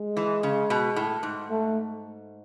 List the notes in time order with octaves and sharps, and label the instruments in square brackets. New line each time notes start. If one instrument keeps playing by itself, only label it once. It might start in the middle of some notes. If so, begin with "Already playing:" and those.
Already playing: [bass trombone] G#3
[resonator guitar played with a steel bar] E3
C#3
B2
A2
G#2
[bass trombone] A3